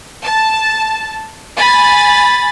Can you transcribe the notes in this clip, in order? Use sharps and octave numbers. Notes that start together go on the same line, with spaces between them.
A5
G#5 B5 A6